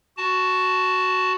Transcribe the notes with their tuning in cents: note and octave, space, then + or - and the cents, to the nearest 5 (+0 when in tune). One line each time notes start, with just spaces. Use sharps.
F#4 +0 A5 +0